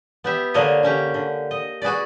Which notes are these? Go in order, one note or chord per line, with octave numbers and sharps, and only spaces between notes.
B3 G4 E5
D3 A#3 D4 C#5 D#5
D3 C#4 G4
D3
D#5
F#4 G#4 B4 D5